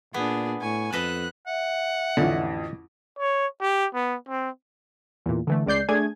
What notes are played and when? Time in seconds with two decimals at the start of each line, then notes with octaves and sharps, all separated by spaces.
0.14 A#2 B3 D4 G#4
0.61 A2 G#5 C#6
0.93 F2 A4 B4 D#5 F#6
1.47 E5 F#5
2.17 A1 F2 D3
3.19 C#5
3.61 G4
3.94 B3
4.29 C4
5.26 E2 A#2
5.47 D3 E3 A3
5.66 C#2 G#3 D5 G6 C7
5.89 A3 D4 G#4 G#5 G#6